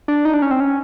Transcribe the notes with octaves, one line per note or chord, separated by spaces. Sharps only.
D4
D#4
D4
C#4
C4
C#4